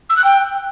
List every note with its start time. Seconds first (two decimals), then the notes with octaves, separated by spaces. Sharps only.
0.09 E6
0.17 F#6
0.24 G5